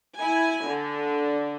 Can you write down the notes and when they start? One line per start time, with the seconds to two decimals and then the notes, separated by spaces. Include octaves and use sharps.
0.19 E4 G#5
0.68 D3